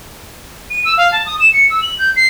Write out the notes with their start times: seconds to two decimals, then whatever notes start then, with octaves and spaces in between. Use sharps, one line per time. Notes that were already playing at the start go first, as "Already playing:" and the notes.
0.71 D#7
0.85 E6
0.98 F5
1.12 A5
1.26 D#6
1.40 E7
1.53 C#7
1.70 E6
1.82 F#7
1.99 G6
2.16 C7